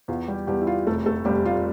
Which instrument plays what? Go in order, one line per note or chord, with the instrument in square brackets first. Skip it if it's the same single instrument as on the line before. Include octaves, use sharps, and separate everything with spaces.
[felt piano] E2 F4
G3 G4
E2 G3 G4
E4
F4
F1 A3 A4
A3 A4
F1 G3 G4
F4